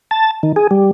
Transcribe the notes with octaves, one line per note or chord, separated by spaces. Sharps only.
A5
D#3
G#4
G3